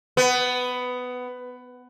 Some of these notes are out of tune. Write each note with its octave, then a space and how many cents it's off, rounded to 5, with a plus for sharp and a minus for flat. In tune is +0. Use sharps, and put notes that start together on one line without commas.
B3 +15